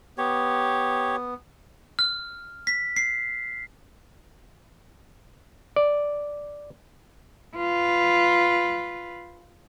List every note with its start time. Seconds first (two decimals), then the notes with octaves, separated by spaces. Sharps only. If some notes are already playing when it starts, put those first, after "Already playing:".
0.18 B3 G4 C#5
1.99 F6
2.67 B6
2.97 C7
5.76 D5
7.56 F4 B4